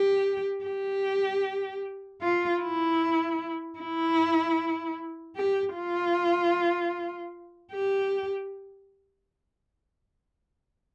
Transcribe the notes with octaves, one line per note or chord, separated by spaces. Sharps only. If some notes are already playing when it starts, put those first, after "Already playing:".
Already playing: G4
G4
F4
E4
E4
G4
F4
G4